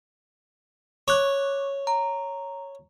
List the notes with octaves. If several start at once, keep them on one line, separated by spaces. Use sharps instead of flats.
C#5 C#6 D6 F#6
A#5